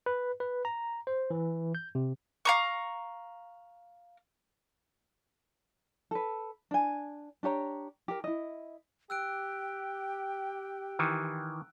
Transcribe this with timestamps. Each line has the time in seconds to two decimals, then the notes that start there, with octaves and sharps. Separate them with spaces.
0.06 B4
0.40 B4
0.65 A#5
1.07 C5
1.30 E3
1.75 G6
1.95 C3
2.45 F5 A#5 C#6
6.11 A4 B4
6.71 D4 G#5
7.43 D4 G4 C#5 A#5
8.08 G4 A#4
8.24 E4 D#5
9.10 G4 G5 E6 F#6 D7
10.99 D#3 E3